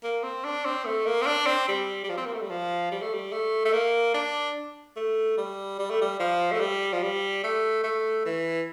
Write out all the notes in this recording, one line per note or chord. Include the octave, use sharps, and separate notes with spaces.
A#3
C4
D4
C4
A3
A#3
C4
D4
C4
G3
G3
F3
C4
A#3
A3
G3
F3
G3
A3
G3
A3
A3
A#3
D4
A3
G3
G3
A3
G3
F3
A3
G3
F3
G3
A3
A3
E3